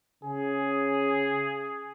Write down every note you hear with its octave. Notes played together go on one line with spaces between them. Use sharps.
C#3 G#4